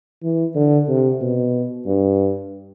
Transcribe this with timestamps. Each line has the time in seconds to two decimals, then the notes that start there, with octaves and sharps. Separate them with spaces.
0.23 E3
0.55 D3
0.89 C3
1.21 B2
1.86 G2